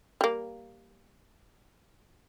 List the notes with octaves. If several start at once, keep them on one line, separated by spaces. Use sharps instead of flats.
G3 A#3